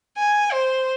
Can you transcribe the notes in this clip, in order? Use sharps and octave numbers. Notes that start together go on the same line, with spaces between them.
G#5
C5